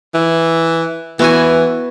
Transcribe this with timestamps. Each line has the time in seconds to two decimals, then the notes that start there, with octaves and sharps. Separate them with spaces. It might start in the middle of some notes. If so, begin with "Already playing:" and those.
0.14 E3
1.19 E3 B3 F#4 G#5